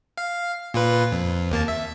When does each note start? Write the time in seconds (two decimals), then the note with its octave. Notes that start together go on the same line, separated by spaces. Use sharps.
0.18 F5
0.74 A#2 F4 B4
1.12 F2
1.52 D#2 A#3 A5
1.68 E5